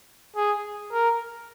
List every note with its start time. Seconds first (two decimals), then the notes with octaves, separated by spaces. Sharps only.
0.36 G#4
0.92 A#4